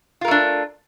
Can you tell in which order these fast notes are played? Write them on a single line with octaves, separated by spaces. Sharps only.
F4 A#4 A3 D4